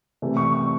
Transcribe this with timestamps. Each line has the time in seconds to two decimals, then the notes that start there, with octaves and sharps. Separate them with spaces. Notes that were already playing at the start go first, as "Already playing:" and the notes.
0.22 C3 E3 A3
0.37 C#6
0.52 C#6